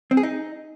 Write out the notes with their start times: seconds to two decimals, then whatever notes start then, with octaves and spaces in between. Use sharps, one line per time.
0.11 C4
0.17 G#4
0.23 D#4